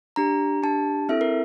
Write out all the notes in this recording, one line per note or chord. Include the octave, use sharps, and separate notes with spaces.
D4 G4 A#5
D4 G4 A5
C4 E4 A4 E5
A#4